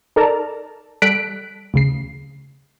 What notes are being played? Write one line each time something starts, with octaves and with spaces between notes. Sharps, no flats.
D#4 A4 A#4 D5 A5 A#5
G3 A4 F#6 B6 D7
D2 C#3 C7